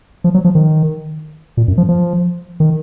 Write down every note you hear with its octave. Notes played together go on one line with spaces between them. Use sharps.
F3
F#3
F3
D#3
A#2
F#2
F3
F3
D#3